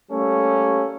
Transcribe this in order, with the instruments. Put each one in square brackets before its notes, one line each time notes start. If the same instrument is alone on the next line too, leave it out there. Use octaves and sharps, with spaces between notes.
[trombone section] G3 A3 A#3 C#4